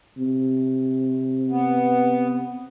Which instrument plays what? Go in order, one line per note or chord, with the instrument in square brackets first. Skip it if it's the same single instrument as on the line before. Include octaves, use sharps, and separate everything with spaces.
[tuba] C3
[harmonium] B3